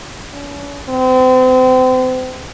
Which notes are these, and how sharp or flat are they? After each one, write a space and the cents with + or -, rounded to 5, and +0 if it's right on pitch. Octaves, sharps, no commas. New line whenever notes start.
C#4 +45
C4 -35